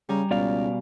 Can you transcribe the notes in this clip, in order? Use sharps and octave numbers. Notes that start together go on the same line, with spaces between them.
C#3 G3 G#5 A#5
C#2 B2 D5 F5